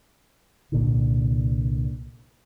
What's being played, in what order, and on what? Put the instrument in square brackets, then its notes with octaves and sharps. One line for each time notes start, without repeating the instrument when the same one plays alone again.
[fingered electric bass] C2 A#2 D3